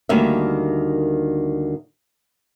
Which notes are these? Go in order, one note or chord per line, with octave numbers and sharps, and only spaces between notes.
D2 D#3 G3 A#3 E5